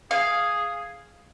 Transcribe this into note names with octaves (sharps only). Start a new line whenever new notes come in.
G#4 F5